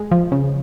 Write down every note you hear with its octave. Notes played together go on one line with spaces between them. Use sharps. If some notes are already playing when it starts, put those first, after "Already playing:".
Already playing: G#3
F3
C#3